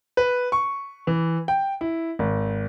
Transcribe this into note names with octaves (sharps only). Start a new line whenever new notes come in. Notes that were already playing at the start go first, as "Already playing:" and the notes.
B4
C#6
E3
G5
E4
G#1